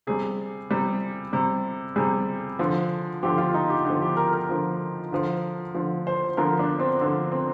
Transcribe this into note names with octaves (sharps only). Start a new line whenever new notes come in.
C3 G3 G#4
C3 G3
C3 G3
C3 G3 G#4
D3 F3
D3 F3 G4
F4
D#4
G4
D3 F3
G4
A#4
A#4
D3 F3
D3 F3
D3 F3
C5
D3 F3 A#4
D4
C4
D3 F3
C4